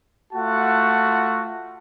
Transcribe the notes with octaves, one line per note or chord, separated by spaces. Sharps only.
A3 F4 F#4 F#5 A5